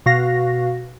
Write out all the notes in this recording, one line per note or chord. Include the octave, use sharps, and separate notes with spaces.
B2 F#4 F5 A#6